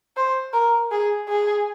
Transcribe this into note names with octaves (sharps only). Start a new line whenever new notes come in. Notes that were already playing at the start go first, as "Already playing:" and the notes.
C5
A#4
G#4
G#4